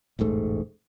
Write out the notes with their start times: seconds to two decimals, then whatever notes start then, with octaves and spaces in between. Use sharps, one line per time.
0.19 E1 A1 G#2 A3